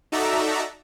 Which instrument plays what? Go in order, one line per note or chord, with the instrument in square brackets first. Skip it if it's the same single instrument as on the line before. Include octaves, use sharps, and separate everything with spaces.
[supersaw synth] D#4 F#4 A4 D5 E5 A#5